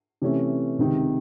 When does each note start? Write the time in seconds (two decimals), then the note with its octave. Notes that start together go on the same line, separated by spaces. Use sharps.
0.22 C3 E3 A3 C#4
0.79 C#2 C3 D#3